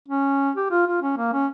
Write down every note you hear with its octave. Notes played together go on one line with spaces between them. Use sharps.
C#4
G4
F4
F4
C#4
A#3
C#4